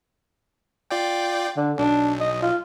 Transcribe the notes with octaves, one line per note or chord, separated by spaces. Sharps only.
F4 D5 G5
D3
B1 D4
D#5
F4